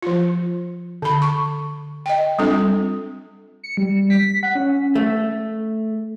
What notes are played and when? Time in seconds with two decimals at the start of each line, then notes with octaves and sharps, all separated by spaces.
0.02 F3 F4
1.02 D3 B5
1.22 C#6
2.06 D#5 G5
2.39 G3 C4 D4 F4 A4
3.64 C#7
3.77 G3
4.10 B6
4.43 F#5
4.55 C#4
4.95 A3